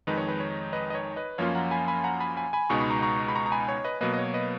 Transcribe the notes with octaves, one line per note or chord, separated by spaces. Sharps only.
F2 D#3 G#3 D#4 B4
C#5
B4
C#5
B4 D#5
D#5
C#5
B4 D#5
F#2 F3 A#3 C#4 F4 C#5 F5
F#5 A#5
G#5 B5
G#5 B5
F#5 A#5
G#5 B5
G#5 B5
G#5 B5
C#2 B2 G#3 B3 D#4 C#6
B5
A#5 C#6
A#5 C#6
B5
A#5 C#6
A#5
G#5 B5
C#5
B4 D#5
B2 F#3 A#3 B4 D#5
D#5
C#5
B4 D#5